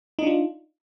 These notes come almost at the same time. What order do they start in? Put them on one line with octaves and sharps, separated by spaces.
D#4 D4 F4